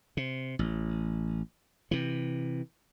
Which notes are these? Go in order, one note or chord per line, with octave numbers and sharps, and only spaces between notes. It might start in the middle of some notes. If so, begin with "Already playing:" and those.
C3
A1
C3 E3